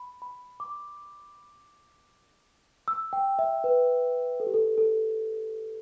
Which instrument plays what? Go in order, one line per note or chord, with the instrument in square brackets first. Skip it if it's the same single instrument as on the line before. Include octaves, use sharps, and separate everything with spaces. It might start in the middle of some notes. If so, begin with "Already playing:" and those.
Already playing: [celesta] B5
B5
D6
E6
G5
E5
B4
A4
G4
A4
A4